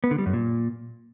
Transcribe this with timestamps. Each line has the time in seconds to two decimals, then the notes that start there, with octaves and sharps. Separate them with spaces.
0.04 B3
0.11 D3
0.19 G3
0.26 F#2
0.33 A#2